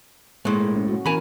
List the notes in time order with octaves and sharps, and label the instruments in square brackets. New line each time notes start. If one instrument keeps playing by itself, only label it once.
[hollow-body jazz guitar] A2 G#3 [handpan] A#3
[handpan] C#4
F#4
[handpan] E3 C#4 A#4 [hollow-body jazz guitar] G#5 B5